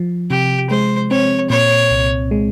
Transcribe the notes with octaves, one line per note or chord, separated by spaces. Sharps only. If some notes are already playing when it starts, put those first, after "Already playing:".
Already playing: F3
C3 G4
G#3 C5
C4 C#5
A#2 C#5
C2
G#3